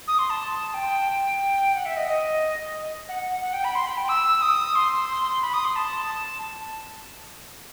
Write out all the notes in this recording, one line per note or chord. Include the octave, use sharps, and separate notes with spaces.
D#6
C6
A5
G5
F#5
E5
D#5
D#5
F#5
F#5
G5
B5
C6
B5
G5
E6
D#6
C6
B5
D#6
C6
A5